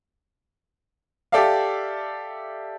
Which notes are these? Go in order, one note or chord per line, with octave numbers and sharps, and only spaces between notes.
G4 A4 D5 E5 F5